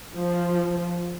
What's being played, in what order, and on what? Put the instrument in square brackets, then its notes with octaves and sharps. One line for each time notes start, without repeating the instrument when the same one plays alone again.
[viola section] F3